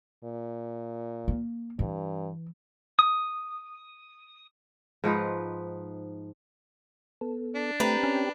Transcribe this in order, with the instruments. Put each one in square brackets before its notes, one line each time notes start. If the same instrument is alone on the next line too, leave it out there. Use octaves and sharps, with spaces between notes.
[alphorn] A#2
[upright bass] A#3
[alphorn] G2 [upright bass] E3
[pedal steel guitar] D#6
[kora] G#2 F3 D#4 B4
[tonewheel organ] B3 A4
[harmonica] D4
[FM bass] A3 [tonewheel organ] C4 G4 G5 [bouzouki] B4 A#5
[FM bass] C#4